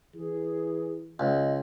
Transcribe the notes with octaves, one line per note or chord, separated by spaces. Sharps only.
E3 G#4
C#2 D#5